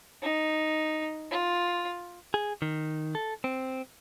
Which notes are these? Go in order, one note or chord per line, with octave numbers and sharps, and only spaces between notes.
D#4
F4
G#4
D#3
A4
C4